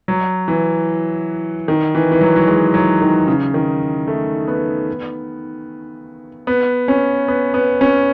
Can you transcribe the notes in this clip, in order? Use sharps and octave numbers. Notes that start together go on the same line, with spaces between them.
F#3
E3
D#3
E3
E3
F#3
F#3
G#3
F#3
D#3
C#3
D#3
A3
B3
B3
C#4
B3
B3
C#4